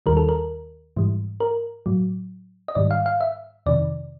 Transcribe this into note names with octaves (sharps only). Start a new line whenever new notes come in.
D#2 D#3 G3 A#4
A4
A#4
G#2 E3 G3
A#4
A2 F#3
D#5
G#2 D#3 G3 D5
F5
F5
E5
F2 C3 D#3 D5